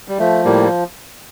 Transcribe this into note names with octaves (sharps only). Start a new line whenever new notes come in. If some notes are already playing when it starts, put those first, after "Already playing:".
G3
F3 A3
A2 G3 A#3